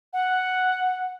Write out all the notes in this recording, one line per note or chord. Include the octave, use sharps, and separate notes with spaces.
F#5